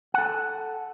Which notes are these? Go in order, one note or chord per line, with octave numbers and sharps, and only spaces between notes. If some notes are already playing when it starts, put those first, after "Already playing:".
A4 F#5